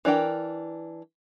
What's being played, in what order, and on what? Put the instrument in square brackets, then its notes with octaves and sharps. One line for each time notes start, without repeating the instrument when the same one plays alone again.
[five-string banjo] E3 D4 A#4 G5